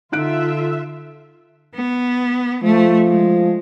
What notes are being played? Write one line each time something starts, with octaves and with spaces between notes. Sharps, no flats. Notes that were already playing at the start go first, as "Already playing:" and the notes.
D3 D#4 F4 E5 F#6 D7
B3
F3 A3
G#3